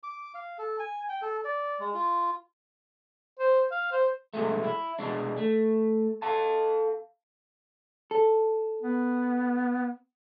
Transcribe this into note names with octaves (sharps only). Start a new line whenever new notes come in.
D6
F5
A4
G#5
G5
A4
D5
G#3
F4
C5
F5
C5
G2 B2 G#3 A3
E4
B2 G#3 D4
A3
A4 F5 A5
A4
B3